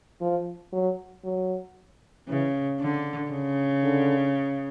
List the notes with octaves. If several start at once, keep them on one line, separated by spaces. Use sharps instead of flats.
F3
F#3
F#3
C#3 E3
D3
C#3
D3